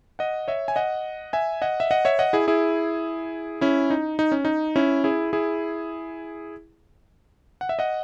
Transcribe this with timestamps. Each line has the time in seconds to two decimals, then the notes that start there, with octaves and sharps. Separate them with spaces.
0.19 D#5 F#5
0.48 C#5 E5
0.68 G#5
0.76 D#5 F#5
1.33 E5 G#5
1.62 D#5 F#5
1.80 E5
1.91 D#5 F#5
2.05 C#5 E5
2.19 D#5 F#5
2.33 E4 G#4
2.48 E4 G#4
3.61 C#4 E4
3.90 D#4
4.19 D#4
4.32 C#4
4.45 D#4
4.76 C#4 E4
5.04 E4 G#4
5.33 E4 G#4
7.61 F#5
7.69 E5
7.79 D#5 F#5